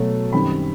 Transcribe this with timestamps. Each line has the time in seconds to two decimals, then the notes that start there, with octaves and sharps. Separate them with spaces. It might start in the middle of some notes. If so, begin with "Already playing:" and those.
Already playing: B2 F#3 A3
0.33 F#2 D#3 G3 C4 B5